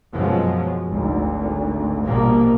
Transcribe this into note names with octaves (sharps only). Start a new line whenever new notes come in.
F#2 B2 F3 G#3
G#1 D2
A#1 B2 F3 G3 A#3